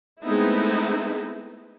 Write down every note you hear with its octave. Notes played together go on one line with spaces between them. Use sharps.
G#3 A3 B3 C4 D#4 E4